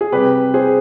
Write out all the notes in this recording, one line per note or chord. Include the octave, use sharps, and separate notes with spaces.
G#4
C3 G3 G4 B4
G#4 C5